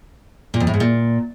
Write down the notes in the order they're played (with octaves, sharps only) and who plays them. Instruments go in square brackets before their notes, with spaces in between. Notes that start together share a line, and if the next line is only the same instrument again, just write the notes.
[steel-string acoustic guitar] A#2
F2
A2
G#2
A#2